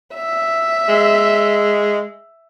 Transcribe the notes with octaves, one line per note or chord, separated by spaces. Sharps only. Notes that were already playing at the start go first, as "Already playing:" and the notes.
E5
G#3